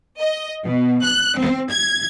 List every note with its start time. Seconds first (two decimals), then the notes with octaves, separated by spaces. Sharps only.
0.19 D#5
0.64 B2
1.01 F#6
1.36 C4
1.69 G#6